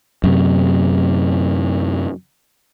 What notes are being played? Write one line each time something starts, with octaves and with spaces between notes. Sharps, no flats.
F#2 C3